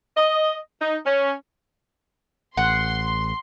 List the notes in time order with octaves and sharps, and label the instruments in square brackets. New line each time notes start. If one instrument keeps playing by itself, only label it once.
[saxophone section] D#5
D#4
C#4
[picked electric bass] A1 [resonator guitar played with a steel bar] F#5 [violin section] C6